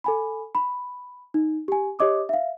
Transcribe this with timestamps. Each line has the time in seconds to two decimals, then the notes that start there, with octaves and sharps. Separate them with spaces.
0.04 A4 G#5 B5
0.55 B5
1.34 D#4
1.68 G4 G#5
1.99 G4 C#5 D#5 D6 D#6
2.29 E5 F5